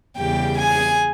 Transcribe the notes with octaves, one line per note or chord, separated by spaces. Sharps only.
E2 C#3 G3 G4 G5
G#4 G#5